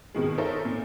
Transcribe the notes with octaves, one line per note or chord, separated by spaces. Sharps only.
G2 B2 D#3 G#3
D#4 A4 A#4 C5 C#5 E5
A#2